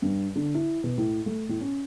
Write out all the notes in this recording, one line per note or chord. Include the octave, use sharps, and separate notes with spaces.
G2
D3
E4
B2
A2
A3
A2
C#4